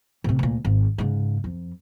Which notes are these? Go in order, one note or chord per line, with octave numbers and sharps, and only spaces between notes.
A1 C3
D2 A#2
G#1
G#2 C#3
F2